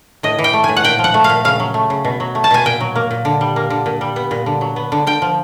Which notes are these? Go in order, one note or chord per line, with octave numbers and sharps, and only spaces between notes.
A2 D#5
E3
G5
A3
A2 G#5
F#5
A#2 G5
F3
F#5
A3
F5
A#2
C#3 F5
F#3
A3
C#3
B2
F#3
A3
A5
B2 G#5
A#2 G5
F#3
A#3
A#2
D3
G3
A#3
D3
A#2
G3
B3
A#2
D3
F#3
B3
D3
D3 G5
F3